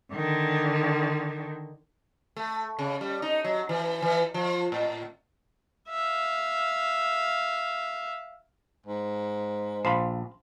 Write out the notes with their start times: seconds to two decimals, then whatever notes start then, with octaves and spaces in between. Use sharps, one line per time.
0.14 D3 D#3
2.36 A3
2.79 C#3
3.01 G3
3.22 D#4
3.44 F#3
3.69 E3
4.02 E3
4.34 F3
4.72 A2
5.89 E5 F5
8.86 G#2
9.85 A#1 C5 F5 B5